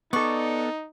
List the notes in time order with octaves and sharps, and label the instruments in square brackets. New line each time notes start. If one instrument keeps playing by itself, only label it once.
[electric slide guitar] B3 A4 [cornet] D#4 [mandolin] D5 C#6